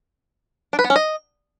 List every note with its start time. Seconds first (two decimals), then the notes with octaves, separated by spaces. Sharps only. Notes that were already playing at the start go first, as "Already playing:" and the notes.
0.73 D4
0.79 B4
0.84 B3
0.90 C#4
0.96 D#5